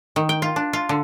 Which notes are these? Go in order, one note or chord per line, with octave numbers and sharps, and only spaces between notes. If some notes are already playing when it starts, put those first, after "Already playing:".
D#3
G5
F4
D4
F4
D3